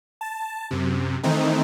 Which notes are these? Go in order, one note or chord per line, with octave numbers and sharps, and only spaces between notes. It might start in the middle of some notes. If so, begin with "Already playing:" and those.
A5
F#2 C3
D#3 E3 A3 C4 D#4